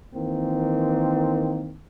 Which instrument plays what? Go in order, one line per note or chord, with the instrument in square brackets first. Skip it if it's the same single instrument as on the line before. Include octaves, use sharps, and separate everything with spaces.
[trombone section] D#3 E3 A#3 C4